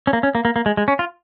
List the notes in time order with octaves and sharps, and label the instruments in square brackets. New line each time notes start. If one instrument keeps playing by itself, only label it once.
[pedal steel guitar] C#4
A#3
C#4
A#3
A#3
A#3
G#3
G#3
C#4
F4